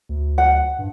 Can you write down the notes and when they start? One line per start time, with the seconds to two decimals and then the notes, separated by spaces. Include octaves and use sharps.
0.09 D2
0.38 F#5
0.79 G2